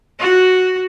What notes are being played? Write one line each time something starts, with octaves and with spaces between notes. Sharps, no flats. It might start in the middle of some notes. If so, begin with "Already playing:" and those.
F#4